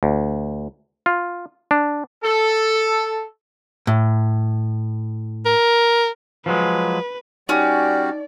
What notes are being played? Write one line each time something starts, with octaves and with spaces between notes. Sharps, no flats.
D2
F4
D4
A4
A2
A#4
F3 F#3 G#3 B4
G3 C#4 D#4 F#4 G4 D5